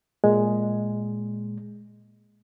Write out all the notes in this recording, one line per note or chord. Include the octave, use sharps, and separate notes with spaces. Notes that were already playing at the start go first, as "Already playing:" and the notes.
A#2 G#3